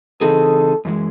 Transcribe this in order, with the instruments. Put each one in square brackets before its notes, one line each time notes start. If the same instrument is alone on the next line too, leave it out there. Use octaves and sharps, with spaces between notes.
[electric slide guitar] C#3 E3 C4 D#4 G#4 [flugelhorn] A4
[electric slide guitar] F#2 E3 G#3